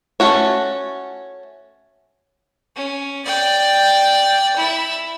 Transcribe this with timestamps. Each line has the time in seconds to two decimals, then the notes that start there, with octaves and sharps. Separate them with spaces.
0.20 A3 C#4 F#4 C#5
2.76 C#4
3.25 D5 G5
4.56 E4 E5